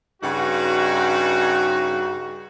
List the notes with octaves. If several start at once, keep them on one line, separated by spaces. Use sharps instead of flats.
G2 C#3 D#4 F#4